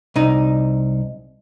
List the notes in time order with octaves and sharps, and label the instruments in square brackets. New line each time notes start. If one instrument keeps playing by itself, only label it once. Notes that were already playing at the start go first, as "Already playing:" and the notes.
[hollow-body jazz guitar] C2 D#4